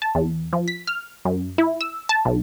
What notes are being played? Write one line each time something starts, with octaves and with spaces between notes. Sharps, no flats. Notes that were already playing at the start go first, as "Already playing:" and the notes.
A5
E2
F3
B6
F6
F#2
E4
E6
A5
B1